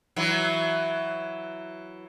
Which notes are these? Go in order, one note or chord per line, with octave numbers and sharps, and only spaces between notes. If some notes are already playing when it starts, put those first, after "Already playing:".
E3 F#3